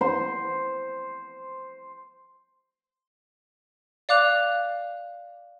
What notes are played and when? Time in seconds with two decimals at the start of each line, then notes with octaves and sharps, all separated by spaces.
0.01 C5 C6
4.09 D5 F5 D6 F#6 F7